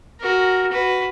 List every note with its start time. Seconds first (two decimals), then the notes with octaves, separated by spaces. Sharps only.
0.20 F#4 A#4
0.71 F#4 B4